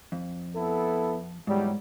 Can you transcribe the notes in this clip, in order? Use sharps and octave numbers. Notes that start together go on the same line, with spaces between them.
F2
B3 E4 A4
E2 G#2 F#3 G3